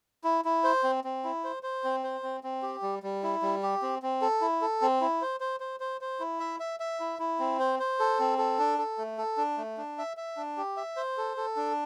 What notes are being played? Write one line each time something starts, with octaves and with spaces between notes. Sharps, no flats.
E4
E4
C5
C4
C4
E4
C5
C5
C4
C5
C4
C4
G4
G3
G3
E4
G3
G4
C4
C4
A4
E4
A4
C4
E4
C5
C5
C5
C5
C5
E4
E5
E5
E5
E4
E4
C4
C5
C5
A4
C4
A4
D4
A4
A3
A4
D4
A3
D4
E5
E5
D4
G4
E5
C5
A4
A4
D4